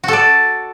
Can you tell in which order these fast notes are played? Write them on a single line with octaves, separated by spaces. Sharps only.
F#4 A4 D5